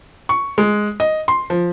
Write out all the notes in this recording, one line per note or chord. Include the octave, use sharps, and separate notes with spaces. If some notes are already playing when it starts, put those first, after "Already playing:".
C#6
G#3
D#5
C6
F3